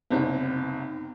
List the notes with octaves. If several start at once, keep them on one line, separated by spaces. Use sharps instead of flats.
F#1 C2 B3 C4 D#4